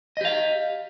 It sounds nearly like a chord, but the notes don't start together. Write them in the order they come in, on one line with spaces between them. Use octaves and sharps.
D#5 G4 F5